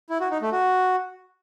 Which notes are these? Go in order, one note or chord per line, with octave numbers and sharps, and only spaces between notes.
E4
F#4
D#4
A3
F#4